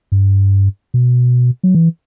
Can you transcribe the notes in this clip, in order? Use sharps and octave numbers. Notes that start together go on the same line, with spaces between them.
G2
B2
F#3
E3